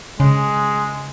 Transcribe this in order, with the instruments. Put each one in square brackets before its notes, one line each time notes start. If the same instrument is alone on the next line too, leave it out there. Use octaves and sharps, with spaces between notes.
[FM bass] C#3 [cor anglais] G#3